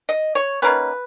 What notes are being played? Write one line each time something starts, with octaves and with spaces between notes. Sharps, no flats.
D#5
C#5
D#3 A#3 C#4 B4